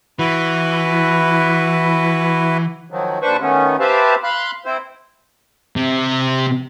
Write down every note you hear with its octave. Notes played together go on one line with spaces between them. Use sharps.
E3 E4 F#4 B4
D#3 F3 F#3
D#2 D4 B4 C5 C#6
D#3 A3 B3 C#4
G4 B4 C5 E5 F5 A5
F5 B5 C6 F#6
C4 E4 C5
C3